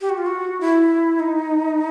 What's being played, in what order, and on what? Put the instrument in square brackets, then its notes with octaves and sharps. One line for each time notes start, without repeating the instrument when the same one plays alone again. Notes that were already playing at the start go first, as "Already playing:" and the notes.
[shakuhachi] G4
F#4
F4
F#4
E4
D#4